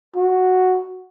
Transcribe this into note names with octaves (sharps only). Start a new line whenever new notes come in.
F#4